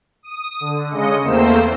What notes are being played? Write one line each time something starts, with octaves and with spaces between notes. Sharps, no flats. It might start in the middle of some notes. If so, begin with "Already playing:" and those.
D#6
D3
C#3 G#3 D#5 C#7
E2 A3 A#3 C4 C5 E6